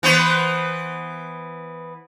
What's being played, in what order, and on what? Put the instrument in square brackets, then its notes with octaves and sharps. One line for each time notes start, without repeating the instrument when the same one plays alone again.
[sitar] E3 B3 C5